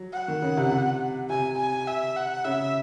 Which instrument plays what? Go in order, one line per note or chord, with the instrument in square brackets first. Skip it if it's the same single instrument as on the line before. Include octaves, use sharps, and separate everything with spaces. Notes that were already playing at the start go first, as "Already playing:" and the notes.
Already playing: [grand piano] F#3
[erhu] F#5
[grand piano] D#3
C#3
C3
C3
[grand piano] C3 [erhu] G#5
[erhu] G#5
E5
F#5
[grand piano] C#3 [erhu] E5